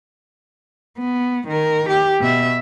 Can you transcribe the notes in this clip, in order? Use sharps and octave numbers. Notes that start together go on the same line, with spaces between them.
B3
D#3 A#4
G4
B2 E5